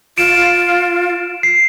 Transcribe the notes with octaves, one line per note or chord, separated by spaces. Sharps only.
F4 D7 E7
C7